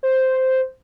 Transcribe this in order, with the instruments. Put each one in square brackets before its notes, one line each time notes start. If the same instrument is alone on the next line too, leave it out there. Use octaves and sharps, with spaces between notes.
[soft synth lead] C5